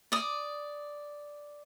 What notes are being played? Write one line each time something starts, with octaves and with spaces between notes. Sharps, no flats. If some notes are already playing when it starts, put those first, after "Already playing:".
D5 D#6